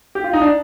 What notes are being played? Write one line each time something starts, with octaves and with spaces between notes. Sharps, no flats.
G4
F4
D#4
D4